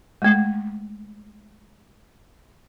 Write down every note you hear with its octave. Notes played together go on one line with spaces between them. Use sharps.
G#3 A3